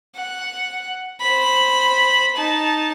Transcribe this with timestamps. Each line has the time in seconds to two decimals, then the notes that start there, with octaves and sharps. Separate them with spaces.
0.15 F#5
1.20 C5 B5
2.35 D#4 A5